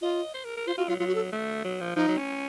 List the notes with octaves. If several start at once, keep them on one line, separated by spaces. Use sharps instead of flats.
F4 D#5
C5
A#4
A#4
F4 C5
F4 F#4
F#3 F4
F#3 F4
F#4
A4
A3
F#3
F3
F3 D#4
F#3
C#4